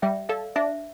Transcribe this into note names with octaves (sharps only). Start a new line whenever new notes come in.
G3 E5 G5
A4 D5 F5
D4 C5 E5